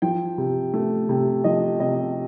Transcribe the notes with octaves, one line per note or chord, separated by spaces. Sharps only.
F3 G5
C3
A3
C3
F3 D#5
C3 D#5